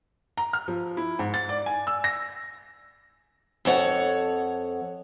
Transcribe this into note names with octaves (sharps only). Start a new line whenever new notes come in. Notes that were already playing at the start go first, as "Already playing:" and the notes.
A#5
F6
F3
E4
G#2
A6
D5
G#5
E6
A#6
F2 A4 C#5 F#5